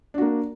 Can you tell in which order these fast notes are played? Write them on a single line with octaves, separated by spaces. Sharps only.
D4 F#4 A#3